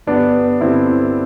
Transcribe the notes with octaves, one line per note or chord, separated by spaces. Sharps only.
G2 D3 B3 D4
G2 D3 C4 E4